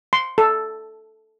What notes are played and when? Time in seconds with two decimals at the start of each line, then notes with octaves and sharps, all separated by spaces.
0.13 C6
0.38 A4